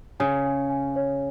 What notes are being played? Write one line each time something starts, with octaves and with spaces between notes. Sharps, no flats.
C#3 G#5
G#5
G#5
C#5